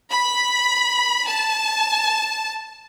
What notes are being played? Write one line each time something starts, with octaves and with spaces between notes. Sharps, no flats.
B5
A5